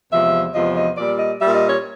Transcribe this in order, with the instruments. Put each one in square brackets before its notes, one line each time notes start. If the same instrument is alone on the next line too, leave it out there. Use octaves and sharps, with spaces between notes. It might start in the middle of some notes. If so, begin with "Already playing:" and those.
[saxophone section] E2 C3 F3 G#3 E5
E2 C3 F3 G#3 D#5
D#5
A#2 G3 D5
D#5
A#2 G3 E5
D#5
C#5